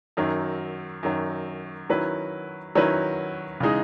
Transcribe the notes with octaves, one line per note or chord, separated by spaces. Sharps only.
F#2 D#3 F#3
F#2 D#3 F#3
D#3 F#3 C#4 E4 B4
D#3 F#3 C#4 E4 B4
C#3 E3 G#3 D#4 G#4